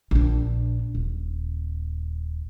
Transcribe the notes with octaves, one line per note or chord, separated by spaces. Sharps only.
A#1 D4
D#1